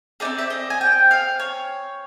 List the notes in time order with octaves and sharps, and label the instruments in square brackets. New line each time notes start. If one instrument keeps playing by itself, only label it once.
[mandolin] D#4 G#4 D5
C4
E5
D#5
G#5
G5
F5
C#5